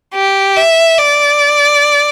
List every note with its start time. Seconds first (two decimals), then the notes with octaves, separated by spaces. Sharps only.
0.14 G4
0.56 E5
0.98 D5